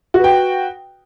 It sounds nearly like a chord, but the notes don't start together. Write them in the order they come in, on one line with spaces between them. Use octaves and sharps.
F#4 B4 G5